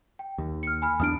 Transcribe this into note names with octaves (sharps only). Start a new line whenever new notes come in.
G5
D#2
F6 C#7
G#5 B5 F6
E2 A3 D4 D#6 F6 D7